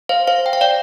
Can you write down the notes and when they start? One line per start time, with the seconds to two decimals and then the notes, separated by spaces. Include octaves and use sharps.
0.09 C5 F5
0.27 C5 F5
0.46 G5
0.53 F5
0.61 D5 G5